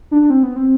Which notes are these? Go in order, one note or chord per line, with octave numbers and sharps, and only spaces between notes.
D4
D4
C4
B3
C4